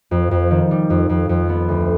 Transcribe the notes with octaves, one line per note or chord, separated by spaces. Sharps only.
F2
F2
D#3
G3
F2
F2
F2
B3
D2